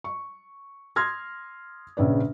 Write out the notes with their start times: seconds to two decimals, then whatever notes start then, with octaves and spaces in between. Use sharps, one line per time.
0.04 C#6
0.96 C6 D#6 F6 G#6 A#6
1.97 A#1 C#3 B4 D5